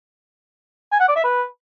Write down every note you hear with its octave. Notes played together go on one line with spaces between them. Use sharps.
G#5
F#5
D5
E5
B4